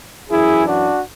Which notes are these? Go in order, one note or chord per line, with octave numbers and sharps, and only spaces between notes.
F#2 E3 E4 G#4
D4 F#4